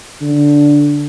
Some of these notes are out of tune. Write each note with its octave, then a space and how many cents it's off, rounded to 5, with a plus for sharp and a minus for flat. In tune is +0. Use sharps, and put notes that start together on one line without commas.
D3 -5